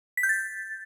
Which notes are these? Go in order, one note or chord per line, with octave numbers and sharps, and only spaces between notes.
B6
G6
A6